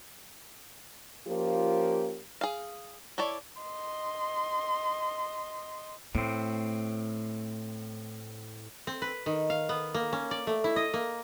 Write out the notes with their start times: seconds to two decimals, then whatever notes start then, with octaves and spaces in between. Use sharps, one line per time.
1.28 F3 A#3 C#4 F4 G4
2.41 G#4 F5
3.18 E4 A4 C#5 D5
3.62 D#5 C6
6.15 A2 A3 C4
8.87 C4
9.02 B4
9.26 D#3
9.50 F5
9.69 B3
9.95 A#3
10.13 C#4
10.31 D5
10.47 A3
10.64 E4
10.76 D#5
10.94 A#3